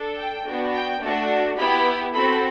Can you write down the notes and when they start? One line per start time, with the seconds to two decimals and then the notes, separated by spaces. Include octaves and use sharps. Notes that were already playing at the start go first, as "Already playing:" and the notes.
Already playing: D4 A4
0.18 G5
0.46 B3 D4 F#4
0.73 G5
1.01 A3 D4 F#4
1.57 B3 E4 G4 B5
2.14 C4 F#4 A4 B5